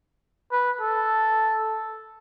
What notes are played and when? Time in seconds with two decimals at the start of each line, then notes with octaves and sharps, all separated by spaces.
0.52 B4
0.81 A4